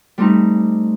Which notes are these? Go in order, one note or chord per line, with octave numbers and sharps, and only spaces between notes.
G3 A3 C4 D#4